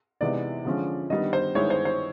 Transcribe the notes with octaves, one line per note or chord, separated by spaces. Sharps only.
C3 E3 G#3 B3 D#4 D5
D3 F3 G#3 C#4
D#3 G3 B3 D4 D#5
C5
G2 D#3 G#3 B3 E4 C#5
C5
C5